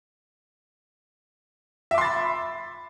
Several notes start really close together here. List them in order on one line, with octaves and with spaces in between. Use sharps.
E5 D6 C6 A6 B5